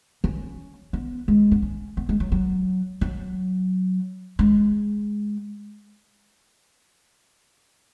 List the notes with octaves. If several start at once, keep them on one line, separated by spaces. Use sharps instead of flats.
C#4
B3
G#3
B3
C#4
B3
G#3
F#3
F#3
F#3
G#3